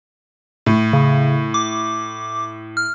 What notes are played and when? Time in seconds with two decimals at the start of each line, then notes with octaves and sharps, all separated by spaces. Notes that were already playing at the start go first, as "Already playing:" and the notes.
0.66 A2
0.93 C#3
1.54 D6
2.77 F6